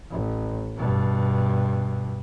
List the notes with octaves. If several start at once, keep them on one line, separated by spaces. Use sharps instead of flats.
A1
G2 B2